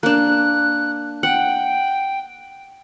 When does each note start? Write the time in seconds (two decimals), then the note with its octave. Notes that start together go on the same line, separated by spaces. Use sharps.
0.03 A#3 D4 F#6
1.23 F#5 G5